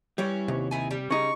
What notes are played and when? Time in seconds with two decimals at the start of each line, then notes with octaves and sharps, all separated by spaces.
0.18 E3 G3 C#4 E4
0.48 D#2 C3
0.71 D#3 E4 G#5
0.91 G3
1.10 C#3 D#4 C#6